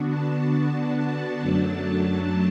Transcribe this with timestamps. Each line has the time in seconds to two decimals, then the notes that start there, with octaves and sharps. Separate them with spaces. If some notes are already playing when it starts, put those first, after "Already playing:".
Already playing: D3 B3 D4 F#4
0.08 A5
0.97 A5
1.42 F#2 F#3 A3 D4
1.86 A5